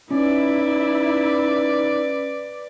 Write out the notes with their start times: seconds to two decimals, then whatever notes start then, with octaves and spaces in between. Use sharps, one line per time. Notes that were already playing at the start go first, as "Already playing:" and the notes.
0.11 C#4 D#4 E4 B4 D5